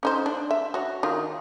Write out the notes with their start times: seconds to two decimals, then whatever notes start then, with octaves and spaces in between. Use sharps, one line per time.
0.03 C#4 D#4 C5
0.26 D4
0.51 E5
0.74 F#4 C#5
1.03 D#3 F4